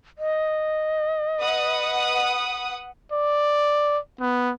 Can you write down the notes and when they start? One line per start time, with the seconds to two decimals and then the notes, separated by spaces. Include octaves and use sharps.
0.19 D#5
1.41 B4 F#5 D#6
3.12 D5
4.21 B3